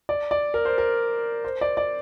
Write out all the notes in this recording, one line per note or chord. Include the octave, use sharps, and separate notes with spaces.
D5
D5
A#4
C5
A#4
C5
D5
D5